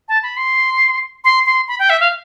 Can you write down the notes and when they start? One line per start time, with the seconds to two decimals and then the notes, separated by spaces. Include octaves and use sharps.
0.08 A5
0.23 B5
0.37 C6
1.24 C6
1.46 C6
1.68 B5
1.79 G5
1.90 E5
2.01 F5